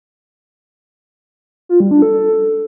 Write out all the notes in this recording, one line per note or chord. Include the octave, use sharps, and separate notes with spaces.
F4
G3
D4
A4